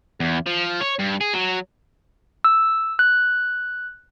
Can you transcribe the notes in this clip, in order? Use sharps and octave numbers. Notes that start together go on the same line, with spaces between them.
E2
F3
C#5
G2
G#4
F#3
E6
F#6